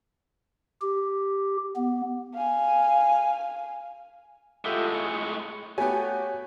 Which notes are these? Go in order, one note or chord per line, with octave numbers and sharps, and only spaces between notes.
G4
B3
F5 G#5
A2 G#3 F4 G4 A4 E5 F#5
G#5 C#6
A3 B3 F#4 G4 C#5 G#5